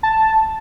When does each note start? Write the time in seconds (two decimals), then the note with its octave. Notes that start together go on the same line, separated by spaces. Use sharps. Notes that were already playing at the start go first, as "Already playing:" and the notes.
0.03 A5